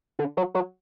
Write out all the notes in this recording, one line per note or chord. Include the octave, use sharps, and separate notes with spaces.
D3
F#3
F#3